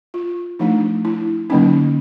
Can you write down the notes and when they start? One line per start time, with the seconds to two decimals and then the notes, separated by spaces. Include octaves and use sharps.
0.14 F4
0.59 F3 A3 D4 D#4
1.05 E4
1.50 D3 F#3 A#3 C#4 D#4